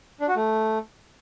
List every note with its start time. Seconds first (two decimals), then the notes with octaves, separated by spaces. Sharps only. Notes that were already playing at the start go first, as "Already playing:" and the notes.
0.20 D4
0.28 F#4
0.36 A3